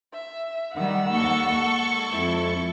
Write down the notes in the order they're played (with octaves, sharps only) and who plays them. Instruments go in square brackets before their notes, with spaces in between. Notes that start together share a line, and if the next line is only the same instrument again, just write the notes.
[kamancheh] E5
[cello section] D#3 G3 [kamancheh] F#5 E6
[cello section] D#2 A#3 [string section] A4 C#6
[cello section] G#3
[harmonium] F2 [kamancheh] E4